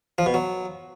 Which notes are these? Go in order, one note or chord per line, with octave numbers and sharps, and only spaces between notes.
F3
B2
F#3